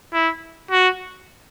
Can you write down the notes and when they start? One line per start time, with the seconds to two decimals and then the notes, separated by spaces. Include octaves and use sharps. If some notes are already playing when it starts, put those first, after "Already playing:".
0.13 E4
0.71 F#4